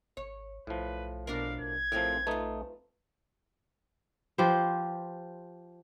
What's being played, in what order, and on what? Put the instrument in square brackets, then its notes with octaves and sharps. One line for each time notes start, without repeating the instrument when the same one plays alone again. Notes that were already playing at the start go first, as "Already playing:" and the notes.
[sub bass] G#1 [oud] C#5
[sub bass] B1 [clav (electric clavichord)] A2 F3 [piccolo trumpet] B4
[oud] B2 D4 A#4 [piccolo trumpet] F5
[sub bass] A#1 [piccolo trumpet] G#6
[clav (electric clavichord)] A2 F3 [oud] C4 G4 A#4
[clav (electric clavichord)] A3 D#4 [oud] F4 B4
[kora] F3 G4 B4 C5